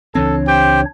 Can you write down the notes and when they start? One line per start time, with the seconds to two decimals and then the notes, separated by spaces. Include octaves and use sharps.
0.15 C#2 E3 C4 D4 A4 C#5
0.47 G4 C5 G5